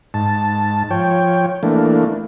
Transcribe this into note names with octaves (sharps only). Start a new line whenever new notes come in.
G#2 A5
F3 C#5 G5
E3 A3 A#3 D4